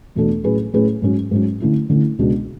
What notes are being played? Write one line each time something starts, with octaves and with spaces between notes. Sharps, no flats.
E2 B2 A3 D4 A4
A2 F#3 C#4 G#4 B4
A2 F#3 C#4 G#4 B4
G#2 F#3 C#4
G#2 F#3 C#4
D3 A3 C#4 E4
D3 A3 C#4 E4
C#2 B2 G#3 D4